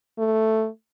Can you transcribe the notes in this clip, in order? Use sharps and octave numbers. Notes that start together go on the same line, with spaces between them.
A3